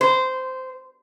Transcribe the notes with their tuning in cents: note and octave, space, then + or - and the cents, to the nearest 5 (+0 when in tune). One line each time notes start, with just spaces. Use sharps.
C5 -15